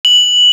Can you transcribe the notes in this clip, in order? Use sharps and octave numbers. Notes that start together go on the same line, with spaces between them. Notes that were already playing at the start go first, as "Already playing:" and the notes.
F#7